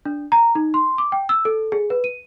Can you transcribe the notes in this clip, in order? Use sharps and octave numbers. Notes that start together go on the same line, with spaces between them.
D4
A#5
D#4
C6
D6
G5
E6
A4
G#4
B4
D#7